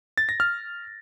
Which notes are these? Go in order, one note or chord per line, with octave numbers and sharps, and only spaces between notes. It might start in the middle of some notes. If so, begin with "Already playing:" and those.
A6
A#6
F6